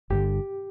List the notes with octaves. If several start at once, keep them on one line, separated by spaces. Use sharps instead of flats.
G1 G2 D3 G4